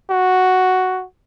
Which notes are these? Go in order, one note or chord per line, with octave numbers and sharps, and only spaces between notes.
F#4